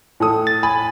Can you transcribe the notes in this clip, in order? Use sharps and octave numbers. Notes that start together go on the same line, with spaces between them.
A2 A4 D#6
A6
G#5 B5